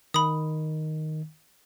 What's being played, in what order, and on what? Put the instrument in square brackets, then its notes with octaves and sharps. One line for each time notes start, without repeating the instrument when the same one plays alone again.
[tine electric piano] D#3 [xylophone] B5 D#6